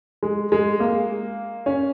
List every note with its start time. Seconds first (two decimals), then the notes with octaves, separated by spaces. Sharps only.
0.23 G#3
0.52 G#3
0.80 A#3
1.66 C#4